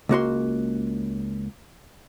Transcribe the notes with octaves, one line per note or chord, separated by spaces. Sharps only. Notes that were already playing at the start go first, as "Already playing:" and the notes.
C#2 A#3 F#4 C6